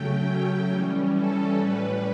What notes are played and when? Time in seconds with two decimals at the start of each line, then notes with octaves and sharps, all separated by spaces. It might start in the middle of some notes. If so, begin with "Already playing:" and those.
Already playing: C#3 F#3 A3 C#4 G5
0.70 E3 G3 C#4
1.14 A4
1.57 A2 G3 C#4 B4